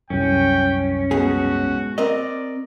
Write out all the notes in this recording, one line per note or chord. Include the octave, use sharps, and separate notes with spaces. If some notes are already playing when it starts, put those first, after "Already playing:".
C2 F#2 C#4 G5
G#2 B2 F#4 G#4
C4 A#4 D5 D#5